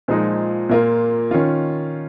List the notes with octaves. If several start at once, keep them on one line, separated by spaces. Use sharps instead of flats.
A#2 F3 G#3 D#4
A#2 A#3 F4
D#3 C#4 F4